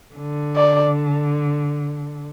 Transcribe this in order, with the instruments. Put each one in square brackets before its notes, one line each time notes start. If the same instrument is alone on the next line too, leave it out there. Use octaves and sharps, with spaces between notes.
[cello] D3
[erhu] D5